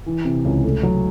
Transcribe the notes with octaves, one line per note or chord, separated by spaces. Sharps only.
E3
C3
C#2
A3
F#3